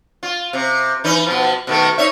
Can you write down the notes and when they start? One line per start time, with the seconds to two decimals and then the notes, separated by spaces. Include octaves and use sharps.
0.23 F4
0.53 C3
1.04 E3 D#4 B4
1.27 B2 F3
1.67 B2 D#3 A3
1.98 D#4 C#5 E5